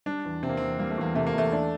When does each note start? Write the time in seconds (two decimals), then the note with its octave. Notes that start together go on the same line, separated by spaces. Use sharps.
0.06 G3 D4
0.25 E2
0.43 C3 C4
0.49 A#3
0.57 E2 C4
0.79 G3 A#3
0.90 A3
0.98 E2 A#3
1.15 C3 A3
1.27 A#3
1.34 E2 A3
1.52 D4